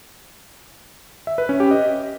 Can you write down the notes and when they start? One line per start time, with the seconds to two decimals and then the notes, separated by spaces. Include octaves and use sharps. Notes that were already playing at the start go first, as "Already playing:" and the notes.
1.27 E5
1.38 B4
1.49 C#4
1.60 G4
1.71 D#5